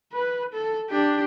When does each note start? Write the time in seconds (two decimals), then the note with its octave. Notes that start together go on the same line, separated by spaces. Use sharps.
0.13 B4
0.53 A4
0.90 D4 G4